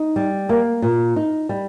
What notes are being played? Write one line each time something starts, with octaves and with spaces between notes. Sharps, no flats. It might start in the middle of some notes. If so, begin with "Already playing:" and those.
Already playing: D#4
G3
A#3
A#2
D#4
G3